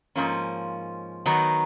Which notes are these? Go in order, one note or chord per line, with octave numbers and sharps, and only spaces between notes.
G#2 F3 A#3 C#4
D#3 F#3 B3 D#4